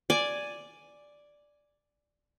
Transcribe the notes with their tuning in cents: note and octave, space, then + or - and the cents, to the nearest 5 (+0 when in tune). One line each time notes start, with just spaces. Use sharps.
D5 +0 G#5 +0